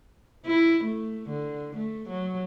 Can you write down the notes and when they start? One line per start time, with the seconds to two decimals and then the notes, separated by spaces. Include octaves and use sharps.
0.46 E4
0.84 A3
1.29 D3
1.76 A3
2.09 F#3